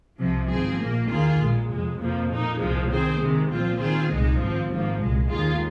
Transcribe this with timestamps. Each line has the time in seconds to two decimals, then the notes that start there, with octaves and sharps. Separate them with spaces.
0.19 C2 C3 F3
0.50 G#1 G#2 F3 C4 G#4
0.80 A#1 A#2 A#3
1.10 D#2 D#3 A#3 F4 G#4
1.39 A#1 A#2 G#3
1.70 F2 C3 G#3
2.00 F2 C3 F3 A#3
2.30 A#2 A#3 D#4
2.59 C2 A#2 F3 G#3
2.90 D#3 C4 G#4 C5
3.20 C3 D#3 G#3
3.50 A#2 F3 C4 F4
3.79 D#3 C4 F4 G#4
4.10 C2 A#2 G#3 D#4
4.39 G#1 G#2 F3 C4
4.69 G#1 G#2 F3 A#3
4.99 C2 A#2 G#3
5.29 D#2 D#3 G#3 F4 G#4